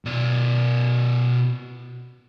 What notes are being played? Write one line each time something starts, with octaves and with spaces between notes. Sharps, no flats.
B2 D5